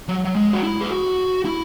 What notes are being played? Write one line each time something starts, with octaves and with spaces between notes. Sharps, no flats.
F#3
F#3
G#3
F#4
E4
G#4
F#4
E4